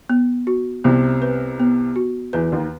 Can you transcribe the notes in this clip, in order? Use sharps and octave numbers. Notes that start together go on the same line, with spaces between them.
B3
F#4
C2 C3 B3
B4
B3
F#4
E2 E3 B4
D#2 D#3